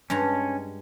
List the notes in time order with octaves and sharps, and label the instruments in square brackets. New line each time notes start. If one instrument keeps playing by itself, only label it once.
[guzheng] G2 G#3 A#5 [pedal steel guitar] C#4